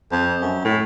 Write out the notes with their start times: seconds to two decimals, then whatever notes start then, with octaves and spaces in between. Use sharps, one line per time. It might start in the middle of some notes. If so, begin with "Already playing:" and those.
0.12 F2
0.41 F#2
0.65 A2